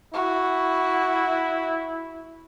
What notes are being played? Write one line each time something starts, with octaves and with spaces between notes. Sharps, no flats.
E4 F#4